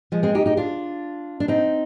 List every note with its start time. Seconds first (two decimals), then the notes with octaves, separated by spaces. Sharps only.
0.12 F3 G#3
0.23 G#3 C4
0.35 D#4 G4
0.46 D#4 G4
0.57 D4 F4
1.40 D4
1.48 C4 D#4